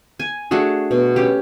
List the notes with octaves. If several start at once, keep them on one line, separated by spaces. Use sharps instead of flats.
G#5
A3 D4 F#4 G#4
B2
C#4 G4